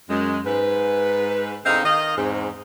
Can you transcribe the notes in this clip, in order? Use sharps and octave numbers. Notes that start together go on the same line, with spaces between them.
F#2 G#3
G#2 B4
E2 D3 C4 D#4 D#5 F5
D#3 D#5 F5
E2 G#2 C4